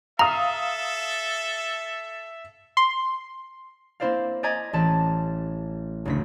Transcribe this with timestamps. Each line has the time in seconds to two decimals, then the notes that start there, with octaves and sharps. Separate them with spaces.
0.19 A4 E5 F5 A#5 D#6
2.77 C6
4.00 A#3 C4 E4 C5 D5 F5
4.43 D5 D#5 G#5 A#5 G#6 B6
4.73 A1 G4 D5 A5 B6
6.05 F#1 D2 B6